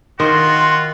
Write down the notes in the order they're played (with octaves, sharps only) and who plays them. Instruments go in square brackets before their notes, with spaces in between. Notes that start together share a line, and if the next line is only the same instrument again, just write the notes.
[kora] D#3 [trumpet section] F4 F#4 [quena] C6